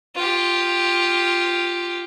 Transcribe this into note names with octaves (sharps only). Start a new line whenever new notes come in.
F4 G4